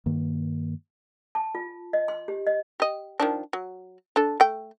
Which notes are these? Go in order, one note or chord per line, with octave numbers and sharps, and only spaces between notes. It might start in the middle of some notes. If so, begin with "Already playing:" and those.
G2 D#3 A#3
A5
F4
D#5
C6
G4
D#5
G4 D#5
D#3 F3 D4
F#3
D4 A4
A3 G5